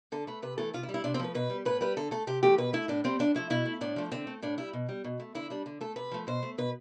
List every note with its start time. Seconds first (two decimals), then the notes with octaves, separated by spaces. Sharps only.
0.12 D3 A4
0.27 A3 B4
0.42 C3 B4
0.58 E3 A3 A4
0.74 C3 F4
0.83 E4
0.89 G3
0.94 E4
1.04 C3 D4
1.14 C4
1.19 F3 A3 B4
1.35 B2 B4
1.50 G3
1.65 A2 B4
1.81 G3 B4
1.97 D3 A4
2.11 A3 A4
2.27 C3 G4
2.43 E3 A3 G4
2.58 B2 B4
2.73 A3 E4
2.88 A2 D4
3.04 G3 C4
3.19 A2 D4
3.35 F3 A3 E4
3.50 B2 E4
3.65 A3
3.81 A2 D4
3.96 F3 A3
4.12 D3 C4
4.27 A3
4.42 A2 D4
4.58 G3 E4
4.73 B2
4.89 G3
5.04 B2
5.20 A3
5.35 D3 E4
5.50 G3 D4
5.66 D3
5.81 A3 A4
5.96 C3 B4
6.12 F3 A3
6.27 B2 C5
6.43 A3
6.58 B2 B4